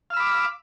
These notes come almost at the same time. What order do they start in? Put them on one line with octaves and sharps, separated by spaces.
F5 E6 B5 D6